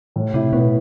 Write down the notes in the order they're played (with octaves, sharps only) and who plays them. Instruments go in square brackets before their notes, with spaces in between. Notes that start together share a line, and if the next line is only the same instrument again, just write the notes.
[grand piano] A2
[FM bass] C3 [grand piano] E4
[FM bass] B2 [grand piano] B3